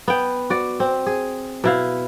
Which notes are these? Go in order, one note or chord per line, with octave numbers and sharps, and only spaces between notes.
B3 G5
F#4 D5
C4
G#4
B2 E4 F5